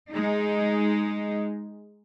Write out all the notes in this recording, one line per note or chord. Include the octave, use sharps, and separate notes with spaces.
G#3 D#4